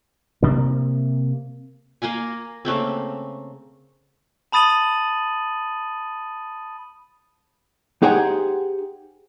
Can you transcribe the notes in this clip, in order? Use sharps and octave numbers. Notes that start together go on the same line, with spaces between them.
C3 A#3
A#3 A#4 F5 G#5
C#3 A3 A#3 C4
A5 B5 D#6 A6 D#7 F#7
D#4 G4 G#4 C5 F#5 G#5